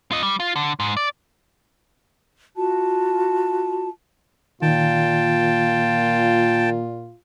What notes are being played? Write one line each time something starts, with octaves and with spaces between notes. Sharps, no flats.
F4 D#5
G3
F4
D3
G#2
D5
F4 F#4 A5
A#2 D#3 F4 G5 A5